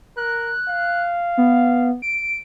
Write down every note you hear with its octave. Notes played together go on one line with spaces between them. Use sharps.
A#4 F#6
F5
B3
D7